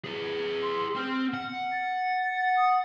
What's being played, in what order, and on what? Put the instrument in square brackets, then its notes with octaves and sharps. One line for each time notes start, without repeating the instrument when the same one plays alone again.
[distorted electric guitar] G#4 B4
[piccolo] C6
[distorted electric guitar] C4 [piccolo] F6
[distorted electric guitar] F#5
[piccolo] A6
D#6